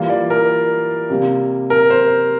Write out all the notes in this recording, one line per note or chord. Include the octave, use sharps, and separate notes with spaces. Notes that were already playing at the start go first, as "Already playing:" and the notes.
Already playing: E3 G3 A#3 F4
D5
A#4
C3 G3 A#3
A#4
C5